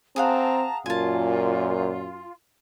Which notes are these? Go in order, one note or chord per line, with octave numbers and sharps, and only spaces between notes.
C4 G#4 F5 F#5 A5 A#5
F#2 A#2 F4 G#5 A5